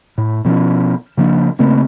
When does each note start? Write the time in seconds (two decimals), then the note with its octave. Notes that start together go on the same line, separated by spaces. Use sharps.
0.18 A2
0.45 B2 F3 C4 C#4
1.17 C#3 F3 A#3 D4
1.59 C#3 A3 A#3 C4